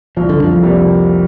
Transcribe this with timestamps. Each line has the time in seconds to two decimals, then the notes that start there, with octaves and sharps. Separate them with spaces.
0.17 C2 F3
0.29 D3
0.43 F2 F3
0.62 C3 G3 A#3